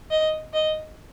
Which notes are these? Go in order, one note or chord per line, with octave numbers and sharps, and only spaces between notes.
D#5
D#5